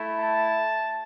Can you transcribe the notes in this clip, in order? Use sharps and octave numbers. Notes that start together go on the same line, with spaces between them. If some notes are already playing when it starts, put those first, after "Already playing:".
Already playing: A3 E4
A5